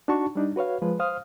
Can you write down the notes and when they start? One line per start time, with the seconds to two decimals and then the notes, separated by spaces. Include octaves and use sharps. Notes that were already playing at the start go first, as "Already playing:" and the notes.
0.08 D4 D#4 F#4 A5 C#6
0.35 G3 D4 D#4
0.56 F#4 B4 C#5 F5
0.82 F3 G#3 B4
0.99 C5 F5 D#6 F6